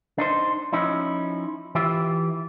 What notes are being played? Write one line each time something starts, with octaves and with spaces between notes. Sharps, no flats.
D4 D#4 C5
F3 C#4 D#4 E4
E3 F4 G4 E5